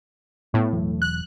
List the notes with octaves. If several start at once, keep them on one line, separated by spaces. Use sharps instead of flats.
A2 A3 B3
E1 E3 F#3
F#6